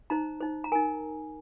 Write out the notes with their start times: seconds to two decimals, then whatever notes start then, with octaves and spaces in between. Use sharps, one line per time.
0.10 D#4 C5 A#5
0.41 D#4 C5
0.64 A#5
0.72 A#4 G#5
0.75 D#4